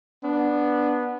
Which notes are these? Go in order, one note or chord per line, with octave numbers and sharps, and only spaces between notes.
B3 D4